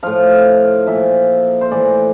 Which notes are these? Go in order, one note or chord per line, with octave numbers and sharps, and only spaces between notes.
A2 F3 F5
A#2 F3 E5
C5
A2 E3 D5